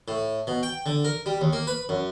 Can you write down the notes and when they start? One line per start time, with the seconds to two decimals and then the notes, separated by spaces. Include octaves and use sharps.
0.08 A2
0.47 B2
0.63 G5
0.86 D3
1.05 A#4
1.26 G3
1.41 D#2
1.53 A#3
1.67 B4
1.89 F#2